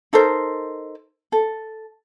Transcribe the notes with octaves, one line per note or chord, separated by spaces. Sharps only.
D#4 A4 A#4 C5
A4